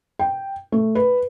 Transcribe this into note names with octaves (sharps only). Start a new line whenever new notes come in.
G5
A3
B4